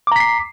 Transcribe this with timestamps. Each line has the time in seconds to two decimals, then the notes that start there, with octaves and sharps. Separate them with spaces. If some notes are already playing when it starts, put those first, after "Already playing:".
0.07 D6
0.12 A#5
0.16 B6
0.20 C7